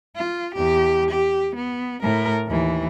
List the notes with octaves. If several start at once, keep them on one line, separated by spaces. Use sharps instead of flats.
F4
E2 G4
G4
B3
A2 A#4
D#2 E3